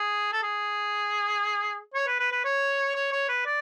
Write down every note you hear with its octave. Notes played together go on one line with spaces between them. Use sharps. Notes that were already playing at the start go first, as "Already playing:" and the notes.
Already playing: G#4
A4
G#4
C#5
B4
B4
B4
C#5
C#5
C#5
B4
D5